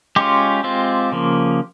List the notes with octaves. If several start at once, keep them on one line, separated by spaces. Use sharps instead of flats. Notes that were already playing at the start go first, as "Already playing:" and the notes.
G#3 C#4 F4 G4
G#3 C4 F4
C#3 F3 A#3